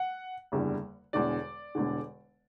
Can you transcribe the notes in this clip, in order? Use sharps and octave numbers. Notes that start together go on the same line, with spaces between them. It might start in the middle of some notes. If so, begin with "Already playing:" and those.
Already playing: F#5
F#1 E2 D3 G3
E1 E2 D3 D5
E1 E2 D3